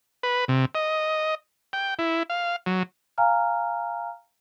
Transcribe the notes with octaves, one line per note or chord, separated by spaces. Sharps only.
B4
C3
D#5
G5
E4
F5
F#3
F5 G#5 A#5 F6